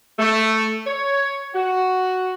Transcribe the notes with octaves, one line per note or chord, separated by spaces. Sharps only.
A3
C#5
F#4